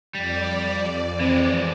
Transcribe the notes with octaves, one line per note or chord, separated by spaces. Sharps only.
F2 G3 D5
E3 G#3 C4